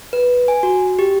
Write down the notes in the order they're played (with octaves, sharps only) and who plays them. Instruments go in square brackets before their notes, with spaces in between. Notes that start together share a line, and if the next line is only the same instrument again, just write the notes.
[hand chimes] B4
G#5
F#4
G4